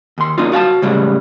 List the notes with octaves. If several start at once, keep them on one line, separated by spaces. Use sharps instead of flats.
D#2 C6
A#3 D4 D#4 F4
F#4 F5 G5 A5
A2 C#3 G3 G#3